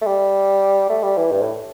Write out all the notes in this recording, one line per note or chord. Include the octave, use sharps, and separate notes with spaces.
A3
G3
A3
G3
E3
G2
A2